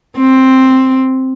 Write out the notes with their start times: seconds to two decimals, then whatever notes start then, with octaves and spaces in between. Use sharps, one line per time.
0.17 C4